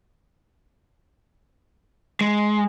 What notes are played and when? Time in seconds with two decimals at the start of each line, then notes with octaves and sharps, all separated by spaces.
2.21 G#3